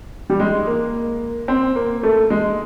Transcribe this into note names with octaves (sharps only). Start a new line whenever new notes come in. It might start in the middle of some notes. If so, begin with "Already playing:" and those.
G3
G#3
A#3
C4
A#3
A3
G#3